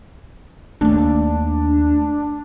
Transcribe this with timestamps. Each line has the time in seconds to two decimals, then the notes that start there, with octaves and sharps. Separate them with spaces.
0.81 D#2 A3 D4